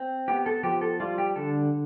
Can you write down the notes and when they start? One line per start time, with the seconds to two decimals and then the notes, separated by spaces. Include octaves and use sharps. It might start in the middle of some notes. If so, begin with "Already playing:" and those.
Already playing: C4
0.28 B3 G4
0.46 A4
0.63 F3 G4
0.81 A4
1.00 G3 F4
1.18 G4
1.36 D3 A4